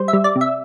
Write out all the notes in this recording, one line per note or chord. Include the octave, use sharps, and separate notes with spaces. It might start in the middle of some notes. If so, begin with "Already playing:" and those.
Already playing: G3 C5
E5
G3
D5
C3
E5